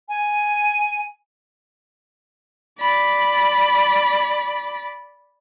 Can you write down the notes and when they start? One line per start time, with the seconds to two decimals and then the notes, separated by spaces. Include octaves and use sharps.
0.09 G#5
2.79 D5 B5